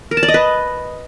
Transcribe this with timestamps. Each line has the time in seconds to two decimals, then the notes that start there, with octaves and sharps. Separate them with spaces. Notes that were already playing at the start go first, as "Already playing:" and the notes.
0.11 A#4
0.17 A5
0.23 D5
0.28 D#5
0.34 B4